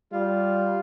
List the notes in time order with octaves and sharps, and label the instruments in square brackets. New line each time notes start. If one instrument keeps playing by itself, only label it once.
[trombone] G3 [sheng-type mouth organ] F4